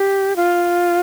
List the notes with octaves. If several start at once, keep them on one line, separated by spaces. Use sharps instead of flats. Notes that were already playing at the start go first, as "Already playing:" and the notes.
Already playing: G4
F4